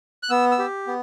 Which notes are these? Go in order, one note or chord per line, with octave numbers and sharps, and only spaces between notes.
F#6
B3 E6
E6
G4
B3